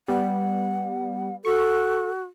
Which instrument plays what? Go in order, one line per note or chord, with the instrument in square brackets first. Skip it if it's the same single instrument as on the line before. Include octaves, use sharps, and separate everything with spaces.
[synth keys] G3 B3 [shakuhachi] F#5
[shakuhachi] F#4 [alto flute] A4 [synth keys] C#6